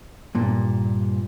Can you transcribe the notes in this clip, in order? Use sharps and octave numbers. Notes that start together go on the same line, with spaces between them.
G2 A#2